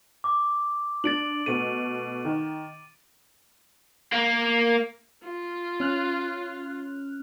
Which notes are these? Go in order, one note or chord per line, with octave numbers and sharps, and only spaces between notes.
D6
D4 A6 D7 F#7
B2 A3 D#7
D#3
A#3
F4
C#4 F6 F#6